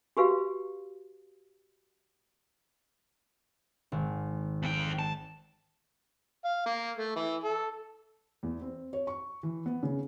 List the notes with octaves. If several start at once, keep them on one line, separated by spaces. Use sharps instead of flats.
F#4 G4 B4 F5
G#1
F2 G5
A5
F5
A#3
A3
E3
A4
E2
C4
C#5
C#6
E3
B3
C#3